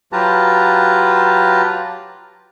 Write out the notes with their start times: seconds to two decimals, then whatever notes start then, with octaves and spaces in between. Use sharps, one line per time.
0.12 F#3 F4 G4 B4 A5 A#5